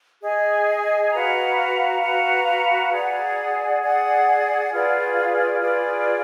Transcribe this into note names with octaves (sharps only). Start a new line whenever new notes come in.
G#4 D#5 G#5
F#4 B4 F5 A#5
F#4 B4 F5 A#5
G#4 D5 F#5
G#4 D5 F#5
F4 G#4 B4 D5
F4 G#4 B4 D5